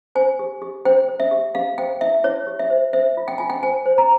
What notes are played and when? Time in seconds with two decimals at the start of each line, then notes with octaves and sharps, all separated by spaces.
0.15 C5 G#5
0.39 G4
0.62 G4
0.85 C5 G5
1.09 C5
1.20 E5
1.31 G4
1.55 G4 F5
1.78 C5 G5
2.01 E4 E5
2.24 E4 C#5
2.47 G4
2.59 E5
2.70 C5
2.93 C5 E5
3.17 F4
3.28 G5
3.38 F4 G#5
3.50 G5
3.63 C5 G#5
3.86 C5
3.98 A#5